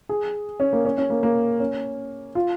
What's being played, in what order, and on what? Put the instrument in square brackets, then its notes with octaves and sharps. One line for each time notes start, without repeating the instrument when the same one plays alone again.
[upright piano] G#4
C#4
A#3
C#4
C#4
A#3
A#3
C#4
F4